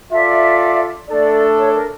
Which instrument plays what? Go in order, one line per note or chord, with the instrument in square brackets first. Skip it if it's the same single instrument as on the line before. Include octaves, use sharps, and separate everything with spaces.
[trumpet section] F4 A4 D5 [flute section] E5
[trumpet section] A3 D4 A4 [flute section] D5
[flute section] C#5
A#4